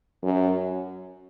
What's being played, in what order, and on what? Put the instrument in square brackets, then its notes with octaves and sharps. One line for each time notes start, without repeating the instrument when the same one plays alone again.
[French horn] F#2